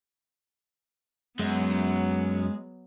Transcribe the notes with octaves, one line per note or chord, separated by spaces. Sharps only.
F#2 F#3 G#3 B3